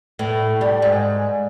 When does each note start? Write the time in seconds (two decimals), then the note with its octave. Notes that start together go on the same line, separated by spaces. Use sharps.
0.19 A2
0.61 G3
0.82 G#2